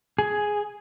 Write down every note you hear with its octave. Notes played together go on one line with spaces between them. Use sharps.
G#4